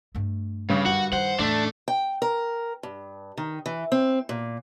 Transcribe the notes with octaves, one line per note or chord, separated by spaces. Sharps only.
G2 A3
G2 C#3
F#2 D3 F#4 F#5
D#3 C5 F#5
E2 A2 A3 D4
G5
A#4
G2
D#3
E3
C4
A#2